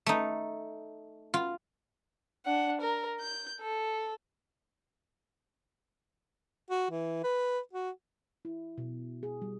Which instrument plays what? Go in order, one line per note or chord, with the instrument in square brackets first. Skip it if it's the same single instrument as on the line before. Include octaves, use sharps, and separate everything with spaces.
[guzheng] A3 D#4
F4
[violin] D4 F#5
A#4
G6
A4
[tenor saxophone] F#4
E3
B4
F#4
[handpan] E4
B2
G#4
G3